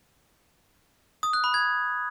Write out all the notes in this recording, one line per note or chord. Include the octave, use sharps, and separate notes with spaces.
D#6
F#6
B5
G#6